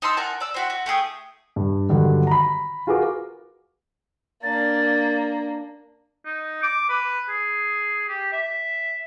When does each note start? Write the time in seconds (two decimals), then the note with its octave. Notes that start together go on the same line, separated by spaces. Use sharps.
0.02 D#4 A5 C6 E6
0.17 A#4 F#5 G#5 A5
0.40 D5 E6
0.54 C4 F#4 E5
0.70 F#4
0.86 A3 G4 G#4 D#6
1.56 G2
1.89 G2 D3 D#3 F#3
2.27 A#5 B5
2.87 F4 F#4 G#4 A#4 B4 D6
4.43 A#3 D4 A6
6.26 D#4
6.63 D6
6.89 B4
7.29 G#4
8.09 G4
8.32 E5